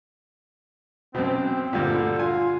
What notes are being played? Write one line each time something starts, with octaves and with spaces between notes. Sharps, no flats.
F#2 B2 C4
D2 G2 A#2 D3
F4 G#5